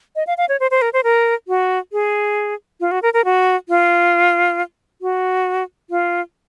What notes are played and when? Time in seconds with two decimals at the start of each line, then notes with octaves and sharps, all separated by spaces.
0.16 D#5
0.27 F5
0.38 F5
0.49 C#5
0.60 C5
0.71 C5
0.82 A#4
0.93 C5
1.04 A#4
1.48 F#4
1.92 G#4
2.80 F4
2.91 F#4
3.03 A#4
3.14 A#4
3.25 F#4
3.69 F4
5.02 F#4
5.90 F4